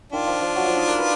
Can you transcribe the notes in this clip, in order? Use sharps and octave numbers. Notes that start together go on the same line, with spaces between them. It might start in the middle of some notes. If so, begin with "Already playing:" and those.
D#3 D4 F4
F3
F3
F#3
F3
D#4
A#4
B4